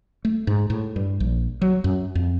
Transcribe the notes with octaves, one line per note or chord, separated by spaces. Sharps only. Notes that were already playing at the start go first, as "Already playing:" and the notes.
A3
G#2
A2
G2
A#1
F#3
F#2
F2